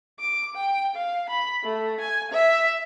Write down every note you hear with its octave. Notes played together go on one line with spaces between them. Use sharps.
D6
G5
F5
B5
A3
G#5
E5